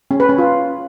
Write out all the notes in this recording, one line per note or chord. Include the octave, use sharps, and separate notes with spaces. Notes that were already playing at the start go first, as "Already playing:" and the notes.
C#4
B4
C#4
F4